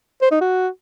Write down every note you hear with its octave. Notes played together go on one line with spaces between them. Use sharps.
C5
D#4
F#4